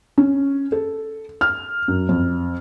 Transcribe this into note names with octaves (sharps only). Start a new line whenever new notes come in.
C#4
A4
F6
F#2
F2